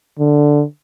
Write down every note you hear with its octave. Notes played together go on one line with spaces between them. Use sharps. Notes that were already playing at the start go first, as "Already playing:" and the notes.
D3